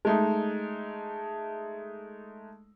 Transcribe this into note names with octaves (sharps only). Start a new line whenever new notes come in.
G#3 A3 D#4